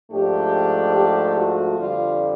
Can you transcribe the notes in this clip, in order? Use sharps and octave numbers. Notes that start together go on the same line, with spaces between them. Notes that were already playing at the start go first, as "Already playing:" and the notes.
G#2 F3 A3 D4 G4
G4
F#4
F2 D3 G3 F4